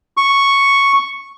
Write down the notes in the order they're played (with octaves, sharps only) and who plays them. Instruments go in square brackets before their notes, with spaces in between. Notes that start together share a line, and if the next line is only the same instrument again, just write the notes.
[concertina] C#6